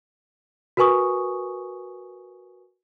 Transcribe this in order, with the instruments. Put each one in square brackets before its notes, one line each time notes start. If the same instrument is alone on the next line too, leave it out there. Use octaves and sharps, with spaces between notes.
[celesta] F#4 A#4 B4 G#5 C#6 D#6